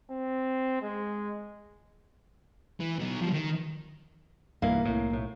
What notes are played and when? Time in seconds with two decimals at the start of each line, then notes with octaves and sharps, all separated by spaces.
0.10 C4
0.81 G#3
2.80 E3
2.99 B2 D#4
3.22 F3 G3
3.33 D#3
4.62 B1 G2 E3 A#3
4.85 C2 A2
5.10 B1 A2